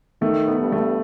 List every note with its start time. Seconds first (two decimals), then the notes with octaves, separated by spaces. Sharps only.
0.22 D#3 A3
0.47 B3
0.59 G2
0.72 A3